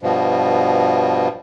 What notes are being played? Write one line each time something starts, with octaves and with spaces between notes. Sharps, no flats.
G2 B2 F3